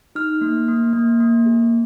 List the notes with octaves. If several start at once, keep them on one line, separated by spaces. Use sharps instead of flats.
D#4 F6
A#3
A#3
A#3
A#3
G#4